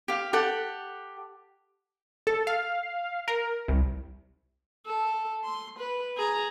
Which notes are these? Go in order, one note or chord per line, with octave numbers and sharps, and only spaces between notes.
G4 F5
G4 A4 F#5
A4
F5
A#4
C2
A4
C6
B4
G#4 A#5